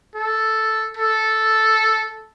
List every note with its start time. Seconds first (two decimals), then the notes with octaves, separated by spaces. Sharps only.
0.15 A4
0.97 A4